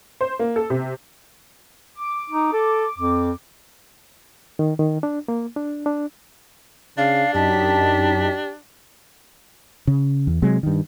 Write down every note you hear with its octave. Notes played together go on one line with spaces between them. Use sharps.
C5
A#3
A4
C3
D6
D#4
A4
F2
D#3
D#3
D4
A#3
D4
D4
C#3 D4 F5
F#2 D#4 G4 A5 B6
C#3
E2
C3 F#3 G#3
G2 D#3